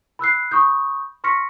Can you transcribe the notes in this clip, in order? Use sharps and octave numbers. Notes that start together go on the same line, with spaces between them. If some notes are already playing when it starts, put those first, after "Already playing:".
B5 E6 F#6 C7
B5 C#6 D#6 G6
C6 C#6 F6 A#6 B6 C#7